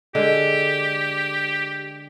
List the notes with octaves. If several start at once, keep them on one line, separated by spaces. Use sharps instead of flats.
D3 G#3 G4